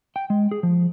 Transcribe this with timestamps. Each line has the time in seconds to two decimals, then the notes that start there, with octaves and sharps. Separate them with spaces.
0.16 G5
0.30 G#3
0.51 G#4
0.63 F3